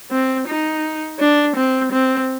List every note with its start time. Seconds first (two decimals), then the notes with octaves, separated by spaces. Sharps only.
0.12 C4
0.48 D#4
1.20 D4
1.57 C4
1.92 C4